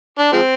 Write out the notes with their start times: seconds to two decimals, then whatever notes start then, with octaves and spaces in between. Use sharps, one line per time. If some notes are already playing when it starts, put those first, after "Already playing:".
0.19 D4
0.32 F3 G#3 C4